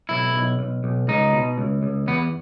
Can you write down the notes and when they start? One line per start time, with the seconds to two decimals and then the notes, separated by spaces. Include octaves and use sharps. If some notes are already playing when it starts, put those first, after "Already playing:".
0.09 B1 E4
0.34 B1
0.59 B1
0.84 B1
1.08 C#2 D#4
1.33 B2
1.58 C#2
1.83 C#2
2.07 E2 B3